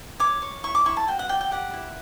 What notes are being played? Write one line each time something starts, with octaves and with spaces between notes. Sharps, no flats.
C#5 D6
C#5
E4 C#6
D6
E4 C#6
A5
F#4 G5
F#5
D5 G5
G5
G4 F#5
E4